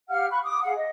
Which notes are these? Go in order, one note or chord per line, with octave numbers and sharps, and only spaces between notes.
G4 F5 F#5 F6
B5 C#6 F#6
D6 D#6
G#4 F5 F#5
D#5